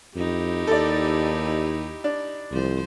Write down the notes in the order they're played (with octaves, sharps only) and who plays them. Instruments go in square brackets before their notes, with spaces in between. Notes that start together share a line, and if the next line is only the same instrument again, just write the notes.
[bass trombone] F2 [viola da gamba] D#4 E4 G4
[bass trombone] D#2 [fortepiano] A4 D5
[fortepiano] D4
[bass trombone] C2 [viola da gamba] F3 C5